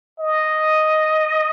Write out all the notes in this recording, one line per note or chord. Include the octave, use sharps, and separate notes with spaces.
D#5